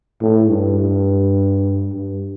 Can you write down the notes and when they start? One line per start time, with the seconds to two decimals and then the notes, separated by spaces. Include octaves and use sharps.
0.21 A2
0.50 G2
0.78 G2
1.94 G2